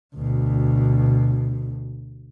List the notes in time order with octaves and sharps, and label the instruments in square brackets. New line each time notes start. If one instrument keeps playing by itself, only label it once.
[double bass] D2 B2